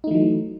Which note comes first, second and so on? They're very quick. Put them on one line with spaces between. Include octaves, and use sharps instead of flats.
D#4 A3 E3 F#3